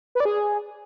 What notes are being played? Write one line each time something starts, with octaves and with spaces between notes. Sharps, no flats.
B4
D5
G#4